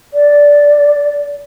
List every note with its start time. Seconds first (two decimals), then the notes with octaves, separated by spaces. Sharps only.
0.14 D5